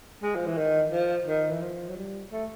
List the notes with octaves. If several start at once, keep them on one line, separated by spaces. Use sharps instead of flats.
G#3
F3
E3
D#3
F3
D#3
E3
F3
F#3
G3
A3